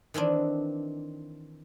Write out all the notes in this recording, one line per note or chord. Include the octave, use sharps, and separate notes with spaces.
D#3 E3 C4 D4